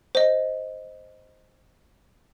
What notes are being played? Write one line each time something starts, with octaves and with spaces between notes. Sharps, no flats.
C5 D#5